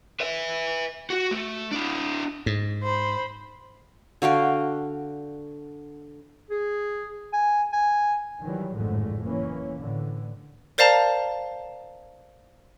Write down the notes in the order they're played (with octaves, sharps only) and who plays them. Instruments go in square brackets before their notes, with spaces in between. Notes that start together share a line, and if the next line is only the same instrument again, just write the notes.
[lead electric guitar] B4 E5
F#4
A3
D4 E4
[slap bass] G#2
[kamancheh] C5 B5
[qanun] D3 F#4 F5 G5
[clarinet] G#4
G#5
G#5
[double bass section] D#3 E3 F#3 G3
G#1 F2 A2 D3 G#3 A3
F#1 E3 A#3 C#4
A2 D3 E3
[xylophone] A#4 C5 D5 F5 A5 A#5